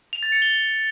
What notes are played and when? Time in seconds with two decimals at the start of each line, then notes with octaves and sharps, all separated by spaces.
0.13 F7
0.23 A6
0.32 C#7
0.42 G7